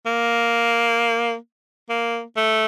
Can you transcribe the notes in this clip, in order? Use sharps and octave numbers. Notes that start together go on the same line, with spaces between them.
A#3
A#3
A3